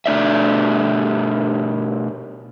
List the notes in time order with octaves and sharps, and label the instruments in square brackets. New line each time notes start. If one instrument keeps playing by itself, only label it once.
[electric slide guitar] B2 A3 D4 D5 E5